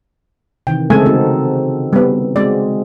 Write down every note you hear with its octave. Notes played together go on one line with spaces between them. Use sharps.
C3 D#3 E3 G5
C#3 G#3 A3 C4 A4 G#5
C4 D#4 F#4
G3 B3
G#3 C4 F#4 D5